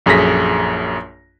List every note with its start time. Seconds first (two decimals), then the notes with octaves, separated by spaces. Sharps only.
0.06 A#1 F#2 G#4 A4 A#6 B6